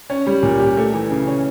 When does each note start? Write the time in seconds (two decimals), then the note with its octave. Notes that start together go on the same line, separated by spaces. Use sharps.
0.10 C#4
0.27 G3
0.43 A#2
0.60 G4
0.77 A3
0.94 E3
1.10 C#3
1.27 C#4